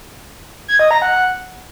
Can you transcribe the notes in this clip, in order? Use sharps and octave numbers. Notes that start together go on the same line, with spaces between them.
G#6
D#5
A#5
F#5